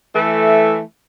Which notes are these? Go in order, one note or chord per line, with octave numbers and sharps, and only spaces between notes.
E3 A3